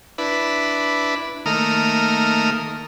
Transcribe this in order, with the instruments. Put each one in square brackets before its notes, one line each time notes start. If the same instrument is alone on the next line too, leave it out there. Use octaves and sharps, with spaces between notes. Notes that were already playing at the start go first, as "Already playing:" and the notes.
[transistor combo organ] D4 E4 B4
D#3 A3 A#3 A#4 D#6 F6